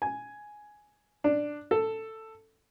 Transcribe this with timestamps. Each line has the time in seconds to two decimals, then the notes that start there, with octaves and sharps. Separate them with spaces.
0.02 G#5
1.24 D4
1.71 A4